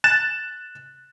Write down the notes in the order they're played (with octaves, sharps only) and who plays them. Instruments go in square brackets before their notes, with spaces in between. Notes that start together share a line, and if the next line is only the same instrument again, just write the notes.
[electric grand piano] F#6 A6 E7